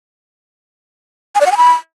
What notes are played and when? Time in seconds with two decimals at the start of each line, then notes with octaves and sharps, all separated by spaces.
1.35 G#5
1.41 D5
1.46 F#5
1.52 G#5
1.57 B5